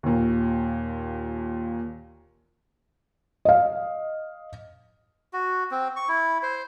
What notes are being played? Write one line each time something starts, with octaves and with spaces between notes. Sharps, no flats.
D#2 A#2
D#5 F5
F#4
C4
C#6
E4
C5